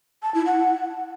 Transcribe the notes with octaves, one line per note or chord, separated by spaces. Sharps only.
A5
E4
F#5